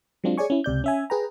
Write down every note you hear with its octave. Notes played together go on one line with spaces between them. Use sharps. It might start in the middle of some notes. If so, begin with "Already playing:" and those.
F#3 G#3 C4 D4 F4
G#4 C#5 D5 G#5 C#6
C#4 E4
C#2 C3 D5 G6
C#4 E5 G#5
G#4 B4 G5 A#5